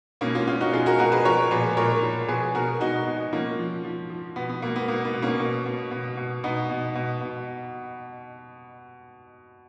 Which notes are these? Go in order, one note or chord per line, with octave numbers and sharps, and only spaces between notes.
B2 A#3 C#4
C#4 F4
B2 C#4 F4
D#4 F#4
B2 F4 G#4
F#4 A#4
B2 F#4 A#4
G#4 B4
F3 A#4 C#5
A#2 G#4 B4
A#2 A#4 C#5
F3
B2 G#4 B4
B2 F#4 A#4
B2 D#4 F#4
B2
F3 A#3 C#4
F3
F3
F3
B2 B3
B3
B2 A#3
B3
B2 A#3
B3
B2
A#3 C#4
B2
B2
B2
B2
B2 B3 D#4
B2
B2
B2